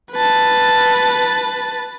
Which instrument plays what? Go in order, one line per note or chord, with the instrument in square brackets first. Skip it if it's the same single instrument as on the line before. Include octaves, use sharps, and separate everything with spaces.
[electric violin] B4 A5